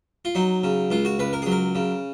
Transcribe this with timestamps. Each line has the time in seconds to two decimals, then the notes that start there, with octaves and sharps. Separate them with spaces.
0.25 F4
0.35 F#3 D#4
0.64 C#3
0.90 C#2 F4
1.05 F#4
1.19 C#2 B4
1.33 A#4
1.42 G#4
1.46 F#3
1.52 A#4
1.75 C#3